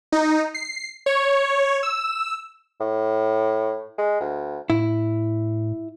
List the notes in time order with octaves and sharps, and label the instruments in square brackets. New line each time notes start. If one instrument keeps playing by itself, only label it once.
[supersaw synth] D#4
C7
C#5
E6
[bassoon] A2
G#3
D2
[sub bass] A2 [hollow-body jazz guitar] E4